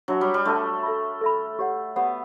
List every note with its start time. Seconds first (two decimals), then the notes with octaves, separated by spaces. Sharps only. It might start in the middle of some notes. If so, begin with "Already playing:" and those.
0.08 F#3 D4 F#4 C#5 E5 A5
0.21 G3
0.34 G3
0.45 A3 D4 F#4 C#5 E5 A5
0.83 A4 E5 B5
1.21 A4 E5 B5
1.59 G4 C#5 F#5
1.96 B3 G4 C#5 F#5